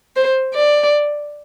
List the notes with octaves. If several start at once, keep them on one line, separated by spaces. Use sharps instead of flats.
C5
D5